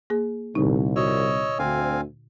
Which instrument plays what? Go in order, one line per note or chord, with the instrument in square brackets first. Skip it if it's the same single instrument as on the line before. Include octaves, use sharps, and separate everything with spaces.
[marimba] A#3 G#4
[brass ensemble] C2 [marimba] A#2 D3 D#4
[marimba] F#4 [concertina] C#5 D#5 E6
[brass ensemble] D2 [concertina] C4 F5 G#5